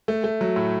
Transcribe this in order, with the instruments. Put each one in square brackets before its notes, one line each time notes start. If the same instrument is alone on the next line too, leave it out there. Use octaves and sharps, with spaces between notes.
[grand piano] A3
A3
F#3
A2